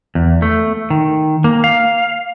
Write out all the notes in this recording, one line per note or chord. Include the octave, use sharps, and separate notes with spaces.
E2
A3
D#3
A#3
F5